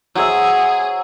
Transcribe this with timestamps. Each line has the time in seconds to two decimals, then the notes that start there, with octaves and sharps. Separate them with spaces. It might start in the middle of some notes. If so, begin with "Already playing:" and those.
0.15 F#3 G#4 C5 E5